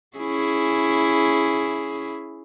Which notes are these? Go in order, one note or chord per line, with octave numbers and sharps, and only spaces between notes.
C#4 E4 G#4